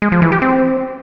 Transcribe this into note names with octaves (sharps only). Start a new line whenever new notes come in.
G#3
F3
E3
G4
C4